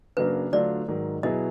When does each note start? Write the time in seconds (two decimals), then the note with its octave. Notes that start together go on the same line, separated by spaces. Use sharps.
0.17 F#2 C#3 F#3 A#3 D4 B4
0.52 D3 F#3 A3 D4 F4 D5
0.88 G#2 D#3 F#3
1.23 B2 F#3 B3 E4 G#4 D#5